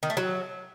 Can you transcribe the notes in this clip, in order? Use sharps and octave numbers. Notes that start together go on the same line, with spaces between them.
D#3
A3
F#3